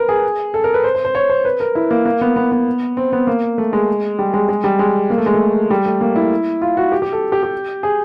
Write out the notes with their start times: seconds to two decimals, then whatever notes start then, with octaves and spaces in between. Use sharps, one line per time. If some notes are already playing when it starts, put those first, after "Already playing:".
Already playing: A#4 B4
0.09 G#4
0.54 A4
0.64 A#4
0.74 B4
0.84 C5
0.95 C5
1.05 C5
1.15 C#5
1.30 C5
1.45 B4
1.60 A#4
1.75 E4
1.91 A#3
2.05 A#3
2.21 B3
2.36 B3
2.52 B3
2.97 C4
3.12 B3
3.27 A#3
3.58 A3
3.73 G#3
4.19 G3
4.34 G#3
4.49 G#3
4.64 G3
4.79 G#3
5.10 A#3
5.18 A3
5.26 G#3
5.34 A3
5.70 G3
5.86 A3
6.01 A#3
6.16 E4
6.62 F4
6.77 F#4
6.92 G4
7.02 G4
7.12 A4
7.32 G4
7.43 G4
7.83 G#4